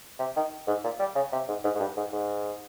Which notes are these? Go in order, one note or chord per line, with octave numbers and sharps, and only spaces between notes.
C3
D#3
G#2
A#2
G3
C#3
C3
G#2
G#2
G#2
G2
G#2
G#2